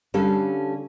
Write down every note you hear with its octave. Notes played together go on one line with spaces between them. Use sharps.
D3 G3 C#4 A4 F5